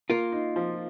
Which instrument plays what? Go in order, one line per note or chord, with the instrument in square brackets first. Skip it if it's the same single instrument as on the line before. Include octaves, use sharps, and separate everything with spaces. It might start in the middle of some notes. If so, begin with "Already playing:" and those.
[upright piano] A#3 [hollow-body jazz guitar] F4 A#4
[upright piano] D#4
F3